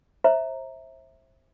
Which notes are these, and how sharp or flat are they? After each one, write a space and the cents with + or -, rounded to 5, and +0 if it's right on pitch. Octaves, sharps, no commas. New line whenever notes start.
C5 +30 E5 -10 A#5 +0